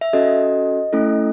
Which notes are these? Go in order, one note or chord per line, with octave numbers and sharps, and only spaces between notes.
E5
C#4 F#4 A4 D#5
A3 C#4 E4 A4